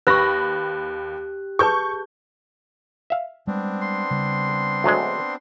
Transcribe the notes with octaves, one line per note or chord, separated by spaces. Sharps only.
D#2 G4 B4 B5 C#6 F#6 A#6
G#4 B4 A5 C#6 G6
E5 F5
G3 G#3 B3 C4 D4
C6
C#3 G3
D2 F#3 G#3